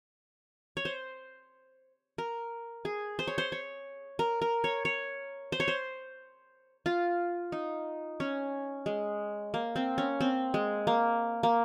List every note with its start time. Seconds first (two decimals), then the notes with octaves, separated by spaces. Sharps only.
0.77 C#5
0.85 C5
2.18 A#4
2.85 G#4
3.19 C5
3.27 C#5
3.38 C5
3.52 C#5
4.19 A#4
4.42 A#4
4.64 C#5
4.85 C#5
5.52 C5
5.60 C#5
5.68 C5
6.86 F4
7.52 D#4
8.20 C#4
8.86 G#3
9.54 A#3
9.76 C4
9.98 C#4
10.21 C4
10.54 G#3
10.87 A#3
11.43 A#3